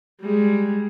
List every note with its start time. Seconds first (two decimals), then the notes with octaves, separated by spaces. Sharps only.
0.21 G3 G#3